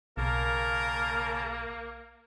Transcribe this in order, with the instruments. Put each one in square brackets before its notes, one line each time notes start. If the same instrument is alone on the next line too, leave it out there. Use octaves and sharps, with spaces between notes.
[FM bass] B1 [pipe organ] C#3 A5 [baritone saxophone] A#3 [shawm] A#4